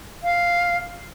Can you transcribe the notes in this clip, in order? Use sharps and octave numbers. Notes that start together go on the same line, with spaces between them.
F5